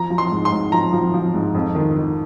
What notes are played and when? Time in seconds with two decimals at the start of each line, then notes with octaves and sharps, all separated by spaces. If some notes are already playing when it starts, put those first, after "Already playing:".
Already playing: F3 A#5
0.10 F3
0.18 C6
0.32 G#2
0.45 C6
0.52 G#2
0.72 F3 A#5
0.93 F3
1.14 F3
1.34 G#2
1.55 F2
1.75 D#3
1.96 D#3